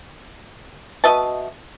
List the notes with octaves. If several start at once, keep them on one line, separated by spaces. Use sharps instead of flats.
B2 D#5 E5 A5